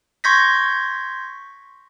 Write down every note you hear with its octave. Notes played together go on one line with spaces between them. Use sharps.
C6 C#6 G6 G#6 A#6 B6